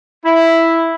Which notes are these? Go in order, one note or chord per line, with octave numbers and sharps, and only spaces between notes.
E4